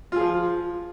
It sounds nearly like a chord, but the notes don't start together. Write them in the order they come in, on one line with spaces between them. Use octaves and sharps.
F4 G#4 F3